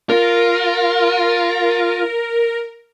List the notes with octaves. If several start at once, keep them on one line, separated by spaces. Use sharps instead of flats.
F4 A#4